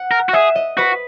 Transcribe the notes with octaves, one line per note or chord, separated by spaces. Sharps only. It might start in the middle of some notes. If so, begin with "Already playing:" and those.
Already playing: F#5
A#4
F#4
G#4 E5
D#5
F#4 B4